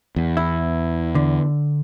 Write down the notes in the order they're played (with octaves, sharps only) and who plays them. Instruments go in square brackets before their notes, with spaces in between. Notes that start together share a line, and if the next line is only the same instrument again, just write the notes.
[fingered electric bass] E2
[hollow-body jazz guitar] E4
D3